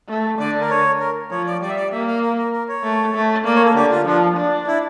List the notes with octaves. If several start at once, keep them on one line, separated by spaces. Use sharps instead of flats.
A3
D3 D5
A#4
C#5
A#4
F3 C#5
D5
G3 D5
E5
D5
A#3 E5
F5
A#4
A#4
A#4
C#5
A3
A3
A#3 D5
C#5
A4
D3 G4
F4
F3 D4
D4
E4